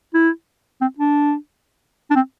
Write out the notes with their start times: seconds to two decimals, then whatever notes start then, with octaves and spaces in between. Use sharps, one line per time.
0.14 E4
0.81 C4
0.98 D4
2.10 D4
2.15 C4